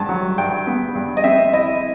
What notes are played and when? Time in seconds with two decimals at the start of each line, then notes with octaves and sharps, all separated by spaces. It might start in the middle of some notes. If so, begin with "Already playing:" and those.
Already playing: G2 A5
0.09 F#3
0.38 G2 G5
0.67 B3
0.95 G2
1.17 D#5
1.24 C4 E5
1.53 E4 D#5